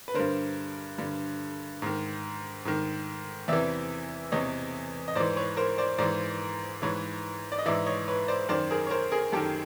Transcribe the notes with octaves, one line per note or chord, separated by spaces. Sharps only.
B4
G2 D3 A#4 C5
G2 D3
G#2 D#3
G#2 D#3
E2 C3 E3 D5 E5
E2 C3 E3 C#5 D#5
D#5
G#2 E3 C5 D5
B4 C#5
A#4 C5
C5 D5
G#2 E3 C5 D5
G#2 E3 B4 C#5
D5
D#5
G#2 E3 D5 E5
C#5 D#5
B4 C#5
C5 D5
F#2 D#3 C5 D5
G#4 A#4
C#5
A#4 C5
G#4 A#4
F#2 D#3 G4 A4